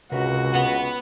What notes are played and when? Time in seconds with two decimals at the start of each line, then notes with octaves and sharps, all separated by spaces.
0.12 C#2 C3 F#4 A#4 B4
0.55 B3 F#5